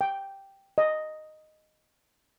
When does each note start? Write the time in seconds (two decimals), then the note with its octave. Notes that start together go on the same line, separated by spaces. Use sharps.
0.01 G5
0.78 D#5